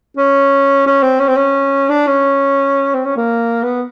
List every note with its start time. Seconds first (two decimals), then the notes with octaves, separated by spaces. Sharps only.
0.17 C#4
0.86 C#4
1.03 C4
1.20 C#4
1.28 C4
1.37 C#4
1.89 D4
2.07 C#4
2.94 C4
3.05 C#4
3.17 A#3
3.63 B3